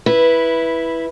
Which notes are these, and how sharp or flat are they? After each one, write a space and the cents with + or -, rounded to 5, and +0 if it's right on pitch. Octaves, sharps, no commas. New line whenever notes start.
E4 +0 B4 -10